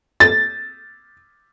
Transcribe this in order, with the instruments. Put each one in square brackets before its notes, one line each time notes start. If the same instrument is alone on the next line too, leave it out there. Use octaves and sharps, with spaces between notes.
[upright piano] A6